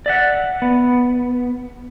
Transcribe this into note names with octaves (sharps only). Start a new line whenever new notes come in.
D5 E5 F#5
B3